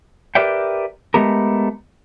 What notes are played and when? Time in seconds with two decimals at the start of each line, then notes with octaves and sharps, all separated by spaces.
0.35 G4 A#4 B4 D5 E5 G5
1.14 G#3 A3 B3 G4 A#4